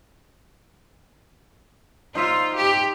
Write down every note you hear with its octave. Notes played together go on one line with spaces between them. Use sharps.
D#4 F4 C5 E5
G4